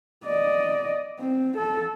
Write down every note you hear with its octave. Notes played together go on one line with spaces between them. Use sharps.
D5 D#5
C4
A4